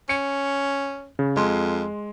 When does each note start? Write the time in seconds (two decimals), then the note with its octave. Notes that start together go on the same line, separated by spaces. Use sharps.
0.09 C#4 C#7
1.19 C#3
1.37 F2 G#3 C6